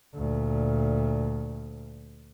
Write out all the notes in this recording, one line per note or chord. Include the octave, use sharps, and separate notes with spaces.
D2 A#2